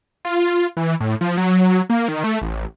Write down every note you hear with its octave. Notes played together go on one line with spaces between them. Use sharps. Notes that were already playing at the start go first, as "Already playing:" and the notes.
F4
E3
A2
F3
F#3
A#3
D#3
A3
A1